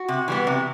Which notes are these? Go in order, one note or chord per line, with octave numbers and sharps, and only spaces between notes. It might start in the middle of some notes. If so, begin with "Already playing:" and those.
Already playing: F#4
C3
E3 G3 B3
C3